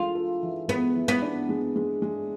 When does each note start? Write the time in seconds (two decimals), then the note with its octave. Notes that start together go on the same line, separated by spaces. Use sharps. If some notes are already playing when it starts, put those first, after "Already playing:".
Already playing: E3 G#3 D4 F4 A4
0.15 A4
0.43 E3
0.68 G#3 B3
0.96 E3
1.08 B3
1.22 D4
1.49 G#3
1.76 G#3
2.02 G#3